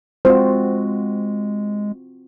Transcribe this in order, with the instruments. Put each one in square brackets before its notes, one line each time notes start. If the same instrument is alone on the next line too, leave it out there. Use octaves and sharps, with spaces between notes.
[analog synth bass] G#3 [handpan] C4 F4 F#4 [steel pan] C5